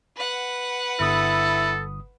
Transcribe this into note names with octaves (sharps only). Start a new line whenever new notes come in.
B4 F#5
G1 E4 A4 D#6